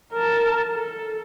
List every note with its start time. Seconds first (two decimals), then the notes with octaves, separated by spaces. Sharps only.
0.13 A#4 A5
0.73 A4